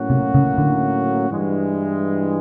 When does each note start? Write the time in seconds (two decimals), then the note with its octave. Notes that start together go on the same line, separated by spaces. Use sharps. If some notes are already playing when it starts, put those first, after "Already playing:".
Already playing: A2 F#3 A#3 C#4 F#4
0.10 C3
0.34 C#3
0.58 D3
1.30 G2 E3 G#3